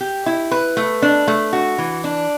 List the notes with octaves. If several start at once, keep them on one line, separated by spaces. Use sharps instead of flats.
G4
E4
B4
A3
D4
A3
F#4
E3
D4